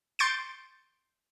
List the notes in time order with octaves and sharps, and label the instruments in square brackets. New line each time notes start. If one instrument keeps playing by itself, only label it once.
[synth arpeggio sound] C6 G6 A6 C#7 D7